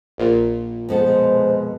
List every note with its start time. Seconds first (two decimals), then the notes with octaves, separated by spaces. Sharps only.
0.18 A#1 A#2
0.89 F2 B2 G#3 A4 C5